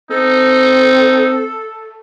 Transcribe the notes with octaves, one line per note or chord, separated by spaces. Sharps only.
C4 D#4 A4